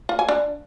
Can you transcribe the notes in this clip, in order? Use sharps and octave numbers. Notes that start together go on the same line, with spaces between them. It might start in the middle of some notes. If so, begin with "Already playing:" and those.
F4
G#5
D4